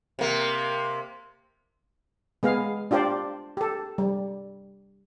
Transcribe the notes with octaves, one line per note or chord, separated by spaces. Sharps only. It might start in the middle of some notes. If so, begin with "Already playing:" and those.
C3 A#3
G#3 B3 G#4 F5
D4 F4 G4 C5 D5
G4 A4
G3